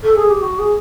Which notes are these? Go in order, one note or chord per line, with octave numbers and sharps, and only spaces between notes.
A4
G#4
G4
F#4
G#4